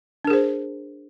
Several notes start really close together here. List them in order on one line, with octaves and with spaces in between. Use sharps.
D4 A#4 G#4 C5